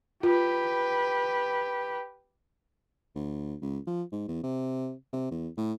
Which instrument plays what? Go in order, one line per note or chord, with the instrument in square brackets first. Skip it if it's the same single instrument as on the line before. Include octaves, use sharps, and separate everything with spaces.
[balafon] F4 [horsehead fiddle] G4 B4
[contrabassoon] D2
C#2
F3
G#2
E2
C3
C3
E2
A2